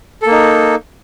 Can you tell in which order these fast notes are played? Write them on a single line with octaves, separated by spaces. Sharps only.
A4 A#3 D#4